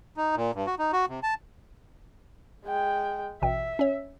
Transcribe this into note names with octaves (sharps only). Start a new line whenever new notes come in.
D#4
A#2
G2
F#4
D#4
F#4
C3
A5
G#3 G5
A1 B2 E5 G5
C#4 C#5